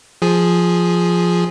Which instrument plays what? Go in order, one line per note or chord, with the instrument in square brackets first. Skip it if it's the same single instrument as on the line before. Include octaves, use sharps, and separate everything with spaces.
[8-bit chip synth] F3 G#4